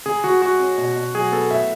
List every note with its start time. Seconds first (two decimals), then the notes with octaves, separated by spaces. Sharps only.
0.06 C#3 G#4
0.24 C#3 F#4
0.41 G#3 F#4
0.59 C#4
0.78 B2
0.96 B2
1.14 F#3 G#4
1.32 B3 A4
1.51 A2 E5